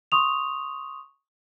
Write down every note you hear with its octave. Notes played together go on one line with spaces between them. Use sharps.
C6 C#6 D#6 F7